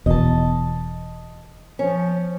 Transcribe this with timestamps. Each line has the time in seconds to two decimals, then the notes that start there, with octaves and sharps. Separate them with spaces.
0.06 E1 E2 B2 D#5 A5
1.79 F3 C#4